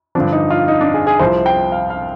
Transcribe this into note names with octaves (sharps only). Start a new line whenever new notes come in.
G2 D3 F3 D4
D#4
F4
D#4
D4
G#4
G#4
C2 C3 F3 C5
G5
F5
F5